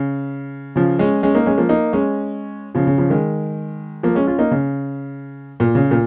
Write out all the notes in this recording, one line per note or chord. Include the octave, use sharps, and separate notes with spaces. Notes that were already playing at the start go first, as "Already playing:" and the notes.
Already playing: C#3
C#3 F3
G#3 C#4
G#3 C#4
A#3 D#4
G#3 C#4
F3 A#3
A#3 D#4
G#3 C#4
C#3 F3
C#3
C#3 F3
D#3 G#3
F3 A#3
G#3 C#4
C#4 F4
A#3 D#4
C#3
A#2
C#3
A#2